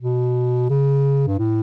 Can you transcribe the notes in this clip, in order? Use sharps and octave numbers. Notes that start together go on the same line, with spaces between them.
B2
C#3
G2
A2